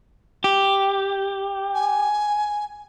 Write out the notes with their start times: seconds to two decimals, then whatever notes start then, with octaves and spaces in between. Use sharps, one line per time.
0.44 G4
1.75 G#5